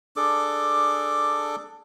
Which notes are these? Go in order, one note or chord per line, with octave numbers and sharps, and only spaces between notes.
D4 G#4 A4 D6